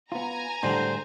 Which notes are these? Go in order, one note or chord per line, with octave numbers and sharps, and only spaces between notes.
B3 F4 G#5 A#5
A2 D3 G3 G#3 C5